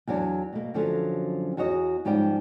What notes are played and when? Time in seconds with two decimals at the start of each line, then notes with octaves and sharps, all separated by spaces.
0.08 E2 F#3 B3 D4
0.53 B2 A#3
0.74 F#2 D3 F3 F#3 C#4
1.57 E2 F#4 G#4 C#5 D#5
2.05 G#2 F3 G3 C#4 G5